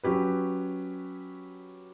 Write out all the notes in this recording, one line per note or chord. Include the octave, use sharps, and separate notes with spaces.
F#3 C#4 G4 B4